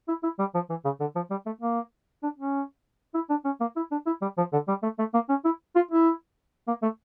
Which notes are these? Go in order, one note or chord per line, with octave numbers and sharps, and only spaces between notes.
E4
E4
G3
F3
E3
C#3
D3
F3
G3
A3
A#3
D4
C#4
E4
D4
C#4
A#3
E4
D4
E4
G3
F3
D3
G3
A3
A3
A#3
C#4
E4
F4
E4
A#3
A3